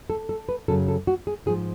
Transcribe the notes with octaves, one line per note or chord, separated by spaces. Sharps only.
A4
A4
B4
F#2 C#3 F#3 A4
A4
F#4
G#4
G#2 F3 G#4